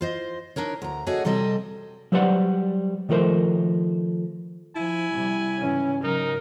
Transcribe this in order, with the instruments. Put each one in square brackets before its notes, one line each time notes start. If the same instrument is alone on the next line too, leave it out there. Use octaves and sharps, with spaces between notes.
[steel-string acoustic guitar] F4 C5 D#5
D4 D#4 A#4 C#5
D2 A#5
A3 D4 F#4 G#4 C#5 D#5
C3 G3 C4 A4 D#5
[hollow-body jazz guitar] F#3 G3 B4 C5 D5 F#5
D#3 F3 A3 A#4 C5
[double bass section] F3 [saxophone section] E4 [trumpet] G#5
[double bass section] C3 G3
[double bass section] G#2 C#3 E3 [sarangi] C#4
[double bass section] G#2 C#3 F#3 [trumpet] D#4 [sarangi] A#4